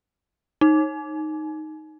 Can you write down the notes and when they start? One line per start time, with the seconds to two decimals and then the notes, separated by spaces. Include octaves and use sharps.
0.61 D#4